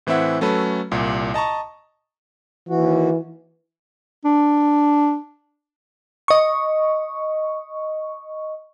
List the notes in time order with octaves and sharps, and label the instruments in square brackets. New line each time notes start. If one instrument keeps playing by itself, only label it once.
[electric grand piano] A2 E3 C4 E4 E5 F#5
F#3 A3 C#4 A4 B4
C2 A#2
D#5 A5 A#5 C#6
[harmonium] D#2 F#4 [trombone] E3
[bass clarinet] D4
[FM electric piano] D#5 C#6